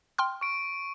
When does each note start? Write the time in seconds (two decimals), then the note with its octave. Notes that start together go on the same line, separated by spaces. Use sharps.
0.18 G5 C6 F6
0.41 C#6 D7